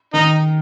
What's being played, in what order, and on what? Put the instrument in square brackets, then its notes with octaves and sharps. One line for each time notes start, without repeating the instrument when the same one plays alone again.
[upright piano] D#3 [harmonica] D#4